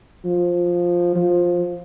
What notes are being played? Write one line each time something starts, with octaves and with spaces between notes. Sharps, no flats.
F3
F3